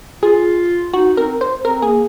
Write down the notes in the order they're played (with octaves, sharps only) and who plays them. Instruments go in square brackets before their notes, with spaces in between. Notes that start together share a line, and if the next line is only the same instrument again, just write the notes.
[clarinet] F4 [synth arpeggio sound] G#4
[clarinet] D#4 [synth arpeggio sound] F#4
[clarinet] C4 [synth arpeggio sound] A#4
[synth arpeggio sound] C5
[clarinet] C4 [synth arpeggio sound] A#4
[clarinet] A#3 [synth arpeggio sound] G#4